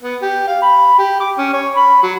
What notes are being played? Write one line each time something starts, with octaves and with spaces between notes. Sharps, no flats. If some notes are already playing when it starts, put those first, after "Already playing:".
B3
G4
F5
B5
G4
D6
C#4
C#5
B5
F#3